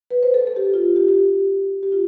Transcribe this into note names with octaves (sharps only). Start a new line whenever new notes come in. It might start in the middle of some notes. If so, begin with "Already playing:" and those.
B4
C5
A4
A4
G4
F4
G4
G4
G4
F4